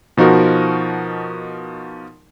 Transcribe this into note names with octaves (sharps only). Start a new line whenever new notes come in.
B2 F3 D#4 F#4 A#4